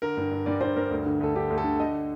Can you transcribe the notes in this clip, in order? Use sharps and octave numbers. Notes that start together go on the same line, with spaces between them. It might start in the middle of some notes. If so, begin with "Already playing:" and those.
D3 A#4
G2
G2
G2 D5
G2 C5
G2 A#4
D2
D3
D2 A4
D3 G4
D2
A4
D3
D3 D#5